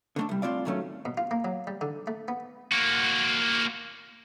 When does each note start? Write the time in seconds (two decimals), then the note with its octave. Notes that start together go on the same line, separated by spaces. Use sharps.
0.16 D3 A3 D4
0.29 C2 G3
0.42 A2 C4 F4 D5 F5
0.65 A2 D#3 F#3 G3 A3 C#4
1.05 B2
1.18 F4
1.31 A#3
1.45 F#3
1.67 G3
1.81 D3
2.07 A3
2.28 B3
2.72 A#3 F#4